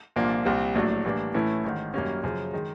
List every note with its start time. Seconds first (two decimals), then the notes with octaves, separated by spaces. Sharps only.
0.16 C2 A#2 F3 A#3 D4
0.45 C2 A#2 G3 C4
0.75 A#1 A2 F#3 A3 D4
1.05 A2 E3 G3 A#3 D4
1.34 A2 E3 A3 C#4 E4
1.64 A1 G#2 D#3
1.94 F#2 D#3 G3 A#3 C#4
2.23 F#2 C#3 F3
2.53 D#3 G#3